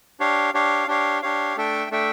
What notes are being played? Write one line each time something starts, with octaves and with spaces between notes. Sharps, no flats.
D4 G4 C#5 F5
D4 G4 C#5 F5
D4 G4 C#5 F5
D4 G4 C#5 F5
A3 D4 A4 E5 G5
A3 D4 A4 E5 G5